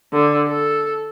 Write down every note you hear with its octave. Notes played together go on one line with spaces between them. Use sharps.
D3
A4